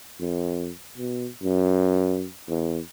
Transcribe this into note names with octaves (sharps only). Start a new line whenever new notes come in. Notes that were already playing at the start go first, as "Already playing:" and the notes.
F2
B2
F#2
E2